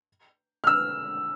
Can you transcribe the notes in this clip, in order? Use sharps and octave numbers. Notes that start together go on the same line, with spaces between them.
F6
E6